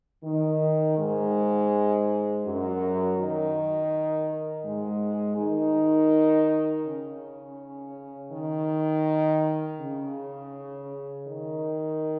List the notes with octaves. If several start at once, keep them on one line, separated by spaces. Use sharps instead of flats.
D#3
G#2 G#3
F#2 F#3
D#3
G#2 G#3
D#3 D#4
C#3 C#4
D#3
C#3
D#3